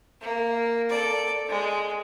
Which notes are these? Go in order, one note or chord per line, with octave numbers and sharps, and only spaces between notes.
A#3
A4 D5
G#3